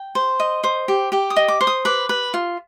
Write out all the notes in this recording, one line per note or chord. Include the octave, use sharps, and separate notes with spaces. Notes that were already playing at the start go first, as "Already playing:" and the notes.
Already playing: G5
C5
D#5
C5
G4
G4 G5
D#6
D#5
D6
C5
D#6
B4 D6
B4
F4